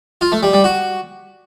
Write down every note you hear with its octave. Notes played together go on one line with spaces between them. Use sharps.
F4
A3
G3
G3
F#4